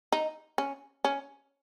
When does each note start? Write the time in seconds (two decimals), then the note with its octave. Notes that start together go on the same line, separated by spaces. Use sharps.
0.12 D#4
0.58 C#4
1.04 C#4